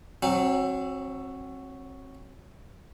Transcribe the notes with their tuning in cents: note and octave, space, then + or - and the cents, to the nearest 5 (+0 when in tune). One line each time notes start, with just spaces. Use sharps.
F#3 +0 C4 +30